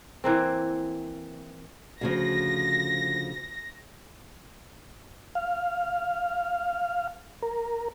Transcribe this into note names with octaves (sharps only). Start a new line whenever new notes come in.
E3 A#3 C4
D2 C#3 F3 A#6
F5
A#4